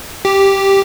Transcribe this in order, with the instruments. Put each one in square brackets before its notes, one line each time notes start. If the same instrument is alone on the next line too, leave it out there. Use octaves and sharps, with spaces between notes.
[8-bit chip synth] G4